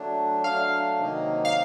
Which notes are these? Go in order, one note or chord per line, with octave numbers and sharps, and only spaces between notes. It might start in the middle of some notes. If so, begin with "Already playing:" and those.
Already playing: F#3 A3 D4
F#3 A3 D4 F5
C3 D#3 F#3 A#3 D#4
F5